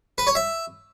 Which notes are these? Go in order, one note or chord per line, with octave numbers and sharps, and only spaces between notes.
B4
C#5
E5